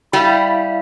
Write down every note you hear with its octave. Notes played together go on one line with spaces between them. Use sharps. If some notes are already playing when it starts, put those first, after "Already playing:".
G3 E4 E5 F5 B5